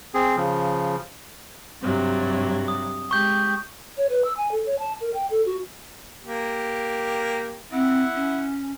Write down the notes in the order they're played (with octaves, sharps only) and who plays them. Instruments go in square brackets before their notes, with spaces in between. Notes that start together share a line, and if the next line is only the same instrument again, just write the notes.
[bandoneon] C4 G#4
C#3 F3
[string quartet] G2 C3 F#3
[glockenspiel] D#6
[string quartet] G#3 G4 [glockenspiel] C#6 G6
[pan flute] C#5
B4
E6
G#5
A4
C#5
A5
A#4
G5
A4
F#4
[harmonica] A#3 G4
[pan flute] C4 [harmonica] E4 F#5
[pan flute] C#4